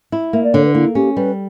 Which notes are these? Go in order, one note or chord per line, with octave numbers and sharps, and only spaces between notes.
E4
A#3 E5
D5
D3 C#5
B4
A#3 E4
C#4 G4
G3 B4